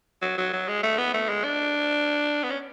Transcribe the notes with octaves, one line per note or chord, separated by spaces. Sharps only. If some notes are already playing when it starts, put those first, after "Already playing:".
F#3
F#3
F#3
G#3
A3
B3
A3
G#3
D4
B3
C#4